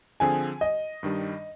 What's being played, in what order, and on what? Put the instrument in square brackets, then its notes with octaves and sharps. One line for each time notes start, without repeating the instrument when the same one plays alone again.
[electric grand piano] D3 F3 C4 F4 G#4 [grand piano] G#5
[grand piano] D#5
[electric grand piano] G2 D#3 G3 D4